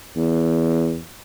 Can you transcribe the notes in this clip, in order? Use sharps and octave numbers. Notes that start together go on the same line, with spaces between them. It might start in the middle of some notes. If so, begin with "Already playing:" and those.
E2